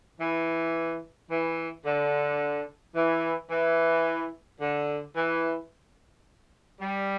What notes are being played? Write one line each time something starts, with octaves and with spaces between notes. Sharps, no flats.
E3
E3
D3
E3
E3
D3
E3
G3